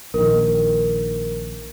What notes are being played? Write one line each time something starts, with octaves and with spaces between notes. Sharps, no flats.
A#1 D#3 A#4